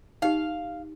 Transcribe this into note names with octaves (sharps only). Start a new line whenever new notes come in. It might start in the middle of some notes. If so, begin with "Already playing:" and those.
D#4 G4 F5